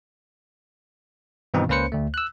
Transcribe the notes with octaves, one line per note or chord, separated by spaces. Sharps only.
G2 B2 D#3 E3 C4 D#4
C#2 A#3 C#4 B4 C5 C#7
D2 A3
E6 F#6